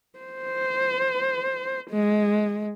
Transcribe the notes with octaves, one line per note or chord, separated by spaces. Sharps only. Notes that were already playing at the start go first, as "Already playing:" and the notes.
C5
G#3